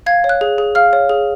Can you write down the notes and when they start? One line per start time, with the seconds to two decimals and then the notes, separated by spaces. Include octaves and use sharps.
0.06 F5 G#6
0.24 C#5
0.29 F#6
0.41 G#4
0.58 G#4
0.75 F5 F6
0.93 C#5
1.09 G#4